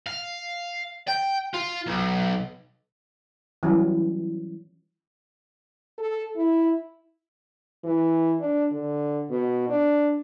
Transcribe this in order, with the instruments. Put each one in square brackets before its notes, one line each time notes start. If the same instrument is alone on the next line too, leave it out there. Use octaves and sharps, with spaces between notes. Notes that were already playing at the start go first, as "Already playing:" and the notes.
[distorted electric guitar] F5
G5
F4
B1
[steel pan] E3 F#3 G3 C#4
[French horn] A4
E4
[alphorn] E3
D4
D3
B2
D4